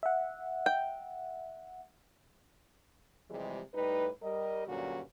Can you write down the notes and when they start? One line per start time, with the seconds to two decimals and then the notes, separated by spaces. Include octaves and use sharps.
0.03 E5 F#5
0.66 G5
3.30 C3 E3 F3 G3 G#3
3.74 A2 G3 D#4 B4
4.23 G3 A#4 D#5
4.68 G2 A#2 D3 F#3 C#4 F#4